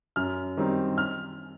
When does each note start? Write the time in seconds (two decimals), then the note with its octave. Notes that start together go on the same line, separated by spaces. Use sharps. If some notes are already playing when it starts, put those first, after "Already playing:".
0.16 F#2 F6
0.57 D#3 G3 C4 D#4
0.98 F6